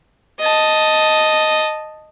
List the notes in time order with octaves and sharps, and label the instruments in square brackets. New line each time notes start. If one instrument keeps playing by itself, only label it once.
[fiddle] D#5 A5